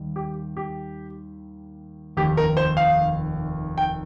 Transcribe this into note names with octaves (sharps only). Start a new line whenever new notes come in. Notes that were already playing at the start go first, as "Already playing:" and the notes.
Already playing: D#2 D#3 G3
G4
G4
F1 D#2 D#3 G4
A#4
C5
F5
G5